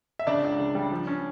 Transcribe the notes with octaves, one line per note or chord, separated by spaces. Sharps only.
E5
C#3 D4 D5
C#2
C#3
G3
F3
C#4